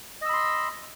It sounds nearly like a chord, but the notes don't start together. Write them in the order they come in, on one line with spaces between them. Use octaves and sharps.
D#5 E6 B5 C6